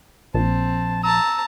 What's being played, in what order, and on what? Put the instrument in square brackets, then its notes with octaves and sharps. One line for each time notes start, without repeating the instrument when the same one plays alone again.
[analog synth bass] A#1 [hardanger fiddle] C4 [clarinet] A5
[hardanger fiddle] A5 A#5 [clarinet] E6